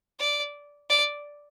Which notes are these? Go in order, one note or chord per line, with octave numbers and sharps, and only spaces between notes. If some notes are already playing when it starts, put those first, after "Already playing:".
D5
D5